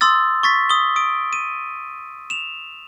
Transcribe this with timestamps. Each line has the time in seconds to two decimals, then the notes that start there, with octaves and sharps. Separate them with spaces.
0.01 C6 D#6 E6 A6
0.43 C#6 A6 B6
0.70 D#6 G7
0.96 D#6 D7
1.33 D#7
2.30 E7 F7